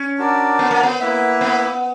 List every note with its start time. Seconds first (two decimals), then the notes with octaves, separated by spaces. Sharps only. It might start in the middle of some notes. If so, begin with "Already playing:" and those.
Already playing: C#4
0.18 D4 F#4 A#4 D5
0.59 B3
0.71 A#3
0.83 B3
1.00 A#3 E4 B4 E5
1.41 B3